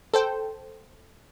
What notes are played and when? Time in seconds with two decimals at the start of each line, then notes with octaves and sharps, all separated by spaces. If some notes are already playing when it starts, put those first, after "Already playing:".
0.14 A4 C5 G5